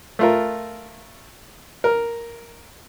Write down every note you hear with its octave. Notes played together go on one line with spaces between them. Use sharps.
A3 F4 A#4
A#4